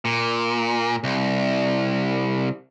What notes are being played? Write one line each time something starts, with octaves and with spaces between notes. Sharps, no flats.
A#2
C2